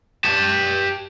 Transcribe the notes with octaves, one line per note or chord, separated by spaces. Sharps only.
G4 A5